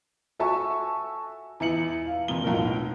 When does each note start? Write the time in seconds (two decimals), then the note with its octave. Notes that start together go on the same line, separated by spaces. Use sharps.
0.39 F#4 A4 E5 G#5 A5 C#6
1.60 E2 E4 C#7 F#7
2.06 F5
2.28 F1 F2 A#3 G7
2.44 B1 A2 F4 A#4